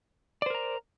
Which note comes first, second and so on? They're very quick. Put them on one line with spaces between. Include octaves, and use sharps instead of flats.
D5 C5 A#4 A#5